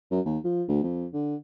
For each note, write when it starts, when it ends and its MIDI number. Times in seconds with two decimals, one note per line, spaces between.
0.11 0.20 42
0.25 0.38 39
0.44 0.63 53
0.68 0.82 38
0.83 1.07 41
1.14 1.35 50